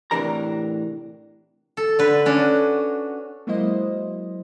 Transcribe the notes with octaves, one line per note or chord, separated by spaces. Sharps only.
A2 C3 E3 D4 A#4 A#5
A4
D3 B4
C#4 D4 F#4
F#3 G#3 A#3 E4 C5 D#5